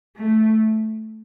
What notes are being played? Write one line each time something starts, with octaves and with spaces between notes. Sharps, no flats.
A3